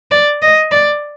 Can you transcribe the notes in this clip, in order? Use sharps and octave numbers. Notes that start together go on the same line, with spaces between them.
D5
D#5
D5